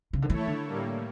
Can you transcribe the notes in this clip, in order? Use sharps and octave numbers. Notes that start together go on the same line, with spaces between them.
C#3
D3
E3 A3 E4 A4 C#5
D3
A2 G3 A#3